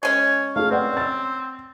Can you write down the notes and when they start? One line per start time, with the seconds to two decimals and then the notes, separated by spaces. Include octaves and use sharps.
0.03 G#3 C#4 C#5
0.56 A3 G#4 F5
0.71 C4 B4 D5 F#5
0.97 E6 A6